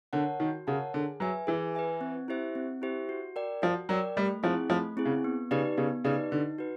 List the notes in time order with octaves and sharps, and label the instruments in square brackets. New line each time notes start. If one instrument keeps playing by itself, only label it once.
[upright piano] D3 [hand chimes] A#4 C#5 F#5 A5
[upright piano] D#3 [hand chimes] F#4
[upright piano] C#3 [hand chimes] A#4 C#5 F#5 A5
[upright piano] D3 [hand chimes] G#4
[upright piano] F#3 [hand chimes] B4 E5 G#5
[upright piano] E3 [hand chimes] G#4
[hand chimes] B4 E5 G#5
C4
E4 G4 C5 E5
C4
E4 G4 C5 E5
F#4
A#4 D5 G5
[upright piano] F3 [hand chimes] F#4
[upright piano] F#3 [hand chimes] A#4 D5 G5
[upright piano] G3 [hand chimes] A3
[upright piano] F3 [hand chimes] C4 E4 G#4
[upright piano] F3 [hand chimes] A3
[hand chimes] C4 E4 G#4
[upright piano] C#3
[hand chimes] B3
[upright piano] C#3 [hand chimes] D#4 G4 B4 D5
[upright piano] C#3 [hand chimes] B3
[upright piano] C#3 [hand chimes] D#4 G4 B4 D5
[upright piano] D3 [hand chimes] D#4
[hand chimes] F#4 B4